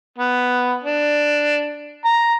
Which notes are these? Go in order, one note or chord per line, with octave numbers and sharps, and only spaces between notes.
B3
D4
A#5